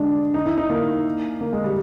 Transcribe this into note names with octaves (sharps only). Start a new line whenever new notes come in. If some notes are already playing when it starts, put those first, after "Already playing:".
Already playing: G#3 D4
D#4
E4
D#4
A#3
A#3
G#3
G3